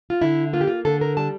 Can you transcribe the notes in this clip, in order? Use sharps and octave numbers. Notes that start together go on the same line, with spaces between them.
F4
D3 E4
A#3 F4
G4
F4
D3 A4
A#4
G3 A5